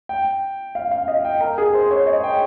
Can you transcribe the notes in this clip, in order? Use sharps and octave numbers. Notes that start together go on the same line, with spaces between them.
G5
F5
F5
D#5
G5
A#4
G#4
C5
C#5
D#5
G5